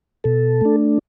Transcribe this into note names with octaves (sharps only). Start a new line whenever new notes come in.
B2 A4
A3 D4